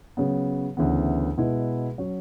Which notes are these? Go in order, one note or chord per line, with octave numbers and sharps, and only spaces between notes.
C#3 F#3 B3
D2 C#3 E3 B3
B2 G#3 B3 E4 B4
F#3 C#4 F#4